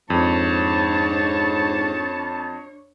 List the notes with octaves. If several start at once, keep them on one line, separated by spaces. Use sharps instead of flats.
F2 G#2 D4 C#5 A5